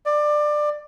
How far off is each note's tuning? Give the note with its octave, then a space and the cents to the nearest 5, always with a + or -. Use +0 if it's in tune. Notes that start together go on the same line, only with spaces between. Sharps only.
D5 +20